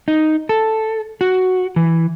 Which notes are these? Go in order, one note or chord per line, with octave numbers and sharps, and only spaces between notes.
D#4
A4
F#4
E3